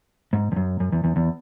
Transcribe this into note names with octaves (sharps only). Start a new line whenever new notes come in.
G#2
E2
F#2
F#2
E2
E2
E2